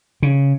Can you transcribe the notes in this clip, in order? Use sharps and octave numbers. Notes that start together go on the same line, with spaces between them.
C#3